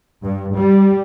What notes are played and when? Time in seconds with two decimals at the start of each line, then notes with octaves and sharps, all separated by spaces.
0.24 G2
0.56 G3